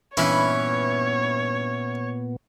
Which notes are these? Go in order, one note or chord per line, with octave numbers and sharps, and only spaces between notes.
G2 A#2 E3 B3 C#4 E4 C#5